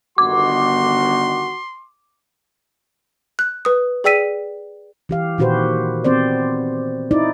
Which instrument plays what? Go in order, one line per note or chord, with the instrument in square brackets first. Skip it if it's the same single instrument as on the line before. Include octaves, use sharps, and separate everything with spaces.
[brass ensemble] G1 D#3 [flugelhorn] F#4 [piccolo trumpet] C6 [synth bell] D6
[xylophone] F#6
B4 D#6
G#4 D5 G5 E6 B6 D#7
[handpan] E3 G4 F5
A#2 D#3 F#4 G4 B4 C5
B3 C4 C5 D5
D#4 E4 D5